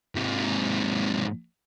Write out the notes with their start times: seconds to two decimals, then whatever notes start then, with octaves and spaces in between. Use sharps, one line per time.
0.15 G#2 C3